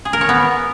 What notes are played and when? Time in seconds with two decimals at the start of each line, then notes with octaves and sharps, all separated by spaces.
0.05 G#4
0.13 A#4
0.21 C#5
0.29 B3